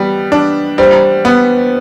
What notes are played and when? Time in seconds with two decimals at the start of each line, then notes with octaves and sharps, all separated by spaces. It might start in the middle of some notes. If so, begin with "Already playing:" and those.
Already playing: G3 B3
0.32 D4
0.78 G3 C5
1.25 B3